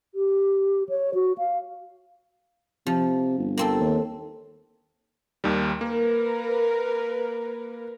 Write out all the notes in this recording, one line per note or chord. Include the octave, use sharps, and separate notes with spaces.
G4
C#5
F#4
F5
C3 F3
G1
A#3 C4 A4
D#2
D#2 D#3 G3
A#3 A#4 B4